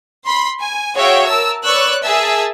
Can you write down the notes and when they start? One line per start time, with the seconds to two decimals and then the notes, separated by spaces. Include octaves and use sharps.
0.25 B5 C6
0.61 G#5
0.97 F#4 G#4 C#5 E5 F5 G5
1.27 A#4 A5 E6
1.65 B4 C#5 D5 C#6 E6 F#6
2.04 G#4 A#4 E5 A5 E6